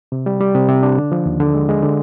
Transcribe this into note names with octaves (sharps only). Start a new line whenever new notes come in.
C3
G3
G3
C3
C3
D4
D3
F3
D#2
D3
G#3
G#3
D3